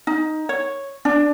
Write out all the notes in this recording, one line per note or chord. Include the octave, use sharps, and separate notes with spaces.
D#4
C#5
D4